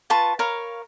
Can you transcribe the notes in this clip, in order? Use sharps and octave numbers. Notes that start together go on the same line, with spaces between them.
F4 B4 A5 C#6
A#4 C#5 F5 B5